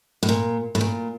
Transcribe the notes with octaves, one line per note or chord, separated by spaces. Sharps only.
A2
A#2
A2
A#2